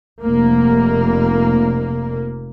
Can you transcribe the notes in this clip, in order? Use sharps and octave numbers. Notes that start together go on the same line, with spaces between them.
F1 A#3